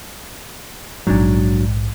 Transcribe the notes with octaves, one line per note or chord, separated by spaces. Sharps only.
A#1 G#2 F#3 D4